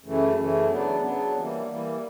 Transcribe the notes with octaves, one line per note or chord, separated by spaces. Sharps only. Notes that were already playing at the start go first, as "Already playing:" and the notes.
F#2 C#3 E3 A3
F#2 C#3 E3 A3
C#3 F#3 B3 D4
C#3 F#3 B3 D4
E3 G3 A#3
E3 G3 A#3